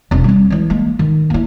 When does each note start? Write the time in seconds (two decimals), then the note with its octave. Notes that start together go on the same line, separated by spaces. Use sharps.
0.11 E1 C4
0.24 G3 C4
0.50 E3 G#3
0.70 G#3 A#3
0.99 D#3
1.30 A#3 E4